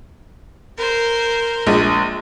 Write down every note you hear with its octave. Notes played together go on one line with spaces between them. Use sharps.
A#4 C5
A#1 G#3